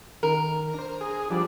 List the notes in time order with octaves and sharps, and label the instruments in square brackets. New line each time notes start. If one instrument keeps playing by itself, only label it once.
[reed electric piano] D#3 [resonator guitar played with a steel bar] A#4
[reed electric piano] D4 C5
[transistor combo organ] G#4
[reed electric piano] F3 F#4 D5 [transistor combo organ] G3 D4